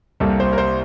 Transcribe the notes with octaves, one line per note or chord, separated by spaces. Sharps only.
C2 C3 G3 A#3 A4
C5
A#4
C5